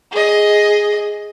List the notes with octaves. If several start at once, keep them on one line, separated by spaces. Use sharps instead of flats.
G#4 D#5